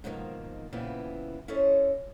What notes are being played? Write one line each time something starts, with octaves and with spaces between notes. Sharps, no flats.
G#2 B2 D#3 F3 G#3 A#3
A#2 C#3 E3 B3 C4 E4
C#4 E4 A4 C5 C#5 D#5